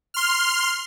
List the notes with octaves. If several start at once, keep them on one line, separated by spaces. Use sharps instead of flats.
C6 F6